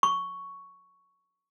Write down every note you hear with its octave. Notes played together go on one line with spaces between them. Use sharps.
C#6